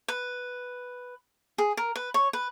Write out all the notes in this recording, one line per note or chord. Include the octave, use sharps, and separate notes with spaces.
B4
G#4
A#4
B4
C#5
B4